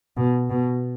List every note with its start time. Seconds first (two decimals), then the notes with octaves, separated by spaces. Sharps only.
0.17 B2
0.50 B2